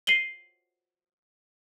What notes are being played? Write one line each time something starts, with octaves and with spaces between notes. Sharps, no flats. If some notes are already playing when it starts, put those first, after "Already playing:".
C7 D#7 F#7 G7